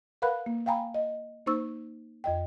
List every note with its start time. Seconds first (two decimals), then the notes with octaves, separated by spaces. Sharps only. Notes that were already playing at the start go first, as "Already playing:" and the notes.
0.22 A#4 B4 F5 F#5 B5 F#6
0.46 A#3
0.66 F5 G5 G#5 A#5 B5
0.94 D#5
1.46 A#3 D#4 C5 C#6 E6
2.24 F2 D#5 G5